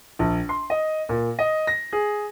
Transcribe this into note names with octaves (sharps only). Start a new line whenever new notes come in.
A#1
C6
D#5
A#2
D#5
A#6
G#4